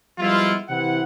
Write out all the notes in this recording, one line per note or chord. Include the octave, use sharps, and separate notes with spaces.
F3 G3 G#3 B3 E4 F4
C3 E3 C4 E4 F#5